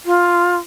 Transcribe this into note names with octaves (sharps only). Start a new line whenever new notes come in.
F4